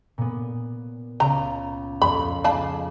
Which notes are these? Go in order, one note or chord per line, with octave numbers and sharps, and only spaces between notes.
A#2 B3
C#2 A#5
F2 B5
G#3 G#4 F5 A5 B5 D6